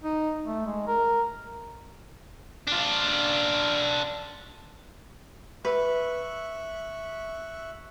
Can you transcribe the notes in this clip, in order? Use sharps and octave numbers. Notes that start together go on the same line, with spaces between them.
D#4
A3
G#3
A#4
D4 F4
B4 E5 C#6 F#6